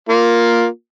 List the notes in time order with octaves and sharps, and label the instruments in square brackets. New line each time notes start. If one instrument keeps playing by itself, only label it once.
[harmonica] A#3 F4